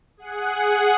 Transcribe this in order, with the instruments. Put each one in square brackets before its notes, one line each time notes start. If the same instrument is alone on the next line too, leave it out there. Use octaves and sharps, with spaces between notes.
[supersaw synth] G#4 F#5 F#6